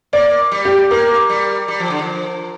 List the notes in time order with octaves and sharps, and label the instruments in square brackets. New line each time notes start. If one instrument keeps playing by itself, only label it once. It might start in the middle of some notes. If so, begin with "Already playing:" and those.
[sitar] A#3 [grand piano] D5
[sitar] G3
[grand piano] G4
[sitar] A#3 [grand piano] A#4
[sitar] G3
G3
F3
D3
F3